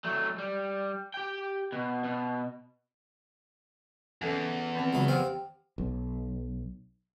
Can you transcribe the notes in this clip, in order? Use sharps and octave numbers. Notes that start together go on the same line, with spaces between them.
F#3 A3
G3
G4 G5
B2
B2
E2 C#4 A4
D#3 C4 A5
C#2 F#3 B5
C4 G4 C5 F5 F#5
B1